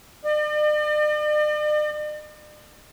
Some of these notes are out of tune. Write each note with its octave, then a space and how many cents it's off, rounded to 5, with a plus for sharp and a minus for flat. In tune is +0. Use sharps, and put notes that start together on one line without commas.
D5 +45